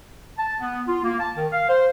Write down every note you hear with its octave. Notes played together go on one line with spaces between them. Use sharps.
A5
B3
F4
A#3
A5
D#3
F5
C5